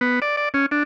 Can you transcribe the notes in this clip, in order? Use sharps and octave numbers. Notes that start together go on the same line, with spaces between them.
B3
D5
D5
C#4
D4